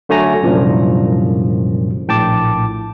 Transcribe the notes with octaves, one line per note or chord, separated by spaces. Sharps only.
D3 F#3 A3 G#5 A#5 A#6
C2 F#2 A#2 D3 F3
A#1 A2 G5 A5 D6